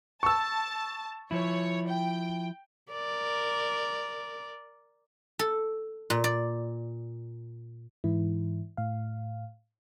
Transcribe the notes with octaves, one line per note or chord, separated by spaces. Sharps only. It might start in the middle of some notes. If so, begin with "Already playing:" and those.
A5 C#6 E6
F3 E4 C#5
G5
A#4 D5
A4
A#2
D5
G#2 E3 E4
A2 F5